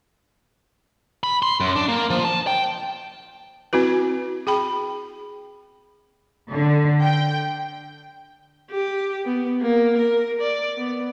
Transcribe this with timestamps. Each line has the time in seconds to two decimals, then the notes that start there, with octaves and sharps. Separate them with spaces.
1.23 B5
1.43 C6
1.60 F#2
1.76 D4
1.89 A#3
2.10 F3
2.25 A5
2.47 G5
3.73 C4 E4 F#4 B4
4.47 G#4 G5 B5
6.51 D3
7.02 G5
8.71 G4
9.25 B3
9.62 A#3
9.98 A#4
10.41 D5
10.78 B3